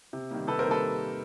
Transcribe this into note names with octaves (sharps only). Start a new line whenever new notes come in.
C3
D#3 G3 A#3
C3 A4 B4
A#4 C5
D#3 G3 A#3
A4 B4